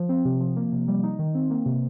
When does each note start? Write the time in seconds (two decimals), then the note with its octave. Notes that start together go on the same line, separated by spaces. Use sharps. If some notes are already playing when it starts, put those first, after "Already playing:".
Already playing: F3
0.09 C4
0.25 C3
0.41 F3
0.56 A#3
0.72 C3
0.88 G3
1.03 D#4
1.19 D#3
1.35 C4
1.50 A#3
1.66 C3